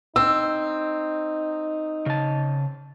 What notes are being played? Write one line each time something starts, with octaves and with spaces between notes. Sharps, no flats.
C4 D#4 E6
C#3 A5